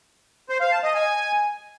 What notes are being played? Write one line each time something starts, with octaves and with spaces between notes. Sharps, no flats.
C5
F5
A5
D#5
G#5